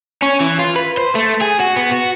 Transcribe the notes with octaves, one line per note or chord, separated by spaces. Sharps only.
C#4
E3
F4
B4
C5
A3
G#4
F#4
B3
F#4